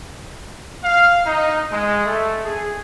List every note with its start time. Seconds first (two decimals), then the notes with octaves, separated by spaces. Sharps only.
0.83 F5
1.25 D#4
1.71 G#3
2.05 A3
2.43 G#4